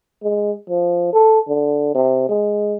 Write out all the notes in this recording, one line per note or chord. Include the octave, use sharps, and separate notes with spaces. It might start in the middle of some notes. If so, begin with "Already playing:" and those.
G#3
F3
A4
D3
C3
G#3